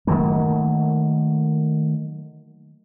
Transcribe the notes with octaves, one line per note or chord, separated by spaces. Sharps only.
D#3 F#3 A3 A#3